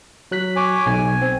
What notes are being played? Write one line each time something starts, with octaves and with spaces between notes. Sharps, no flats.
F#3 F#6 B6
C#5 G#5 D6
B1 G#5
C4